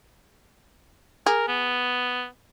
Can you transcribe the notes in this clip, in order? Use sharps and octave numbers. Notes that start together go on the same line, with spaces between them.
G#4 A#4
B3